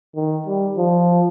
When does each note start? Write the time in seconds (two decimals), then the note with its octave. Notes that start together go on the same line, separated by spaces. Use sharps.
0.16 D#3
0.46 G3
0.77 F3